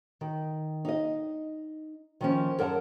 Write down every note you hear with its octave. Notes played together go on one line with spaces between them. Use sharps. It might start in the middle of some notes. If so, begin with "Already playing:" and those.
D#3
D#4 D#5
D#3 F3 C#4
F#2 A#4 F#5 A5